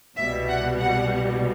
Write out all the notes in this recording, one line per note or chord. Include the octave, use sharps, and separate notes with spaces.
C2 B2 G3 E5
F#5
F#5